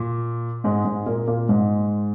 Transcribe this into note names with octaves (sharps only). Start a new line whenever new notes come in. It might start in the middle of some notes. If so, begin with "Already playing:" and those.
Already playing: A#2
G#2 G#3
G#2 G#3
A#2 A#3
A#2 A#3
G#2 G#3